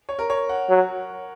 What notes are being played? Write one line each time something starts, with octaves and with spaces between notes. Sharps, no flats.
C#5
A#4
C#5
F#5
F#3